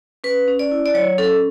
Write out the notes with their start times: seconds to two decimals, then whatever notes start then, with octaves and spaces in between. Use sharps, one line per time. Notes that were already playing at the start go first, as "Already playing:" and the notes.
0.24 C#4 B4
0.48 C#4
0.59 D5
0.71 E4
0.86 D5
0.94 F#3 C#5
1.18 C#4 A4